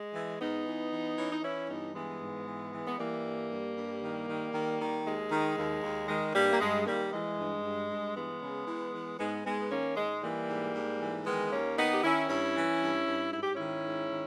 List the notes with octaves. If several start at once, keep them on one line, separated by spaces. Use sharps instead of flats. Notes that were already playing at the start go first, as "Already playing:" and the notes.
Already playing: G#3
E3
G#2 B3 D#4
E3
E3
E3 C#4
D#4
E3 C#4 E4
G2 B3 D#4
E3 G#3 B3
G#2
E3
E3
B3
E3 G3 A#3
G2
G2
G2
D#3
D#3
D#3
D#3
D#2 G#3
D#3
D#2
D#2
D#3 G#3
G2 G3 A#3
A#3
G2 G#3
D#3 G3 A#3
E3 G#3
G2
G2
G2
E3 G#3 B3
C#3
E3
E3
G#2 G#3 B3
G#2 G#3 B3
B3
D#3 A#3 C#4
G#2 G#3
E3 G3 A#3
G#2
G#2
E3
D#3 G#3 B3
D#2 A#3 C#4
D#3 B3 D#4
G4
D#3 C#4 E4
G2 C#4 E4
E3
G2
G2
G#2 E4
G4
D#3 C#4 E4
G#2
D#3